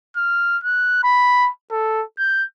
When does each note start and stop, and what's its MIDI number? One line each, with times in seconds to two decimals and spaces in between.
0.17 0.58 89
0.64 0.99 90
1.04 1.50 83
1.71 2.03 69
2.19 2.44 91